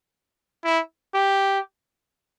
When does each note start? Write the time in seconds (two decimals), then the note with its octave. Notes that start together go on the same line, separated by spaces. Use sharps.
0.64 E4
1.14 G4